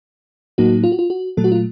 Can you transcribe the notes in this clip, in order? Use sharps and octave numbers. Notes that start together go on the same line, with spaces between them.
A2 F#3 A#3 D#4 F#4
F4
F#4
F4
F#4
A#2 F#3 A3 A4
F#4
F4